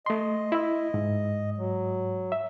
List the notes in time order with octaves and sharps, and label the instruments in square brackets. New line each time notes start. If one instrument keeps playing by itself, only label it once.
[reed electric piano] A3 C6 [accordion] D#5
[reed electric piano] E4 E5
G#2
[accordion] F#3
[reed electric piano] E5